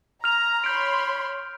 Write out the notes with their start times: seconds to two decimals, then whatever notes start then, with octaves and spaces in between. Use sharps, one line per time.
0.24 A#5 F6 F7
0.64 C#5 B5 C6 G6 D7